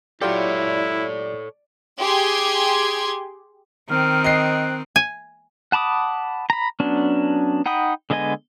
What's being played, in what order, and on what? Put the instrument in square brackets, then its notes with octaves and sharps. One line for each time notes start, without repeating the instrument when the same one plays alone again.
[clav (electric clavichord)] F#3 F4 G4 [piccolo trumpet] E4 [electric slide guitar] A4 C#5 [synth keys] D5
[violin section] G4 G#4 C6 G#6
[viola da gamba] D#3 C4 [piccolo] F6
[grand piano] D#5 C7 [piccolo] F#6
[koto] G#5
[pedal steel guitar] F#5 A5 B5 D6 D#6
A#5 B5
F#3 B3 C#4 D4
D#4 F#5 G5 B5 D#6
D3 G#3 B3 D#5 G#5